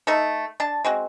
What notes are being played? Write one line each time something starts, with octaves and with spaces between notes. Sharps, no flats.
A3 D#4 A4
D4 A5
G#3 C4 F#4